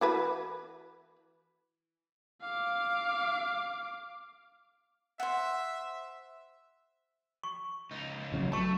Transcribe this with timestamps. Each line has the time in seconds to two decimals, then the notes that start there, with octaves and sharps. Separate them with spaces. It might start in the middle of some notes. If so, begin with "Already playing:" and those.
0.01 E3 F#4 B4
2.42 F5 D6
5.20 C5 E5 F#5
7.43 C#6
7.91 C#2 D#4
8.32 A1 C#3 F#3
8.52 F#3 A3 A5 C#6